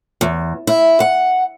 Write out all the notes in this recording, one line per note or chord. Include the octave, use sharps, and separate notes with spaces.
E2
E4
F#5